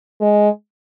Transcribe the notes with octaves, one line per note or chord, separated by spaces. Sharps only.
G#3